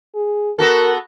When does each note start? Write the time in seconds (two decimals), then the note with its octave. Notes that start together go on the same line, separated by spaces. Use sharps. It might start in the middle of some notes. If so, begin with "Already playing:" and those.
0.15 G#4
0.59 B3 F#4 A4 A#4